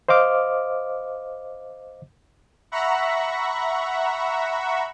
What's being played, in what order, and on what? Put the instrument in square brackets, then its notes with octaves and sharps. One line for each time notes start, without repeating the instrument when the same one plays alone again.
[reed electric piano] C5 D#5 F5 D6 F6
[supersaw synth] E5 F#5 A#5 B5 C#6